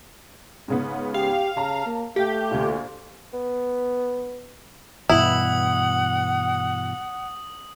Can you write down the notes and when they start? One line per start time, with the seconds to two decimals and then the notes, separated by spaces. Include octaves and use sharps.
0.68 G#2 C#3 B3
1.14 G4 F5
1.57 C#3 A5 A#5
1.86 A#3
2.16 A3 G4 F5 G5
2.51 D2 A#2
3.33 B3
5.10 G2 B2 E3 E4 F#5 D#6 F#7